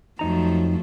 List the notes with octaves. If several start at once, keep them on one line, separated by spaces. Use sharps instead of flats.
F2 F3 F#3 A3 D#4 A#5